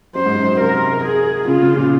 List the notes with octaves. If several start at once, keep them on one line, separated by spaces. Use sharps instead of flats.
F#2 C5
G#2
F#2
C3 A#4
G#4
C#3 F4
C#3
A#2